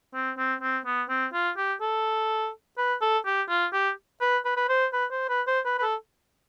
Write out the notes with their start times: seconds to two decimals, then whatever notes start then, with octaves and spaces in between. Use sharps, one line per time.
0.14 C4
0.38 C4
0.61 C4
0.86 B3
1.09 C4
1.33 F4
1.57 G4
1.81 A4
2.78 B4
3.01 A4
3.26 G4
3.49 F4
3.73 G4
4.21 B4
4.45 B4
4.57 B4
4.69 C5
4.93 B4
5.11 C5
5.29 B4
5.47 C5
5.65 B4
5.79 B4
5.82 A4